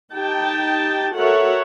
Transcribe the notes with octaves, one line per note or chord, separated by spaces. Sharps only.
D#4 G4 G5 A5
F#4 A4 A#4 C#5 E5 F#5